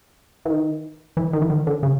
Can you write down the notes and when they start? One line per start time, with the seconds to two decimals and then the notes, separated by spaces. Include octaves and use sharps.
0.45 E3
0.50 D#3
1.17 E3
1.33 D#3
1.42 E3
1.50 D#3
1.67 D3
1.83 C#3